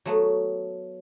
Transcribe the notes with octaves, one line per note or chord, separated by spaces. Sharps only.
F#3 A3 B3